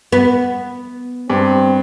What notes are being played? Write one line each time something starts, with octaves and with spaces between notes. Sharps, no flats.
B3
G2 C4